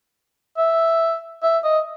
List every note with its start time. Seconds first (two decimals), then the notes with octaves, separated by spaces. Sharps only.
0.58 E5
1.43 E5
1.64 D#5